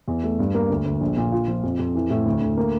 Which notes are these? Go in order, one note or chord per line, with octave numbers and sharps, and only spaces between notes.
E2
A3
G2
A#3
D2
D2
A#1
A#2
F4
F3
F2
F2
E3
A2
D2
D2
A#3